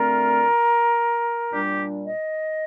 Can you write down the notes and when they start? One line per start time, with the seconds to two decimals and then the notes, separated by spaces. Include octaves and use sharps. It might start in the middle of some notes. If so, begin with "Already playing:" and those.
Already playing: D3 A3 C4 F4 A#4
1.52 A#2 G3 D4 G4
2.06 D#5